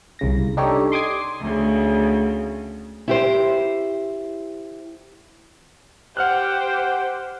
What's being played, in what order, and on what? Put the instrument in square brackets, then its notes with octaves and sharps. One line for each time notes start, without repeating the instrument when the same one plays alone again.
[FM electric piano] C2 C#3 A#6
D4 D#4 G4 A4 C#5
C6 D6 D#6 G#6 C7
[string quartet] D2 C#3
[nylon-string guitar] E4 G4 C5
[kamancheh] G4 C5 [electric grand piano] F#5 F6 F#6